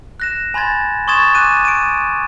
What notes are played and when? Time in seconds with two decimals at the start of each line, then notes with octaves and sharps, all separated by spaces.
0.20 F#6 A#6 E7
0.54 G#5 B5 C6 G#6 A6
1.07 C6 C#6 D#6 G#6 A6 E7
1.35 G#5 D6 F#6 D#7
1.65 D7 D#7